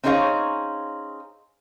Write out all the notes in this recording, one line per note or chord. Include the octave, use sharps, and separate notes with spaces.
C4 C#4 D#4 G#4 C#5 F5